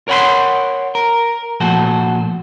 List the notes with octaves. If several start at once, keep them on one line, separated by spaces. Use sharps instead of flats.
A#4 C#5 F#5 B5 C6
A#4
A#2 F3 A3 F#4 A4